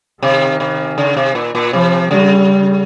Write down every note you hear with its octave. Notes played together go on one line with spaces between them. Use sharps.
C3 D#3
C3
C#3
C3
A#2
A#2
C3 F3
C#3 G3